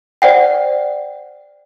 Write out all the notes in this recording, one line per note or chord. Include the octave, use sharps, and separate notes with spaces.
C5 D5 F#5 G5